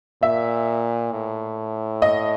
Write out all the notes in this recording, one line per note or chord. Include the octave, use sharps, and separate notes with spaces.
A#2 E5
A2
D#5